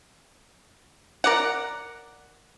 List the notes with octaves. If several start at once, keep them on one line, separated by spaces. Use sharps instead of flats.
A#4 D5 F#5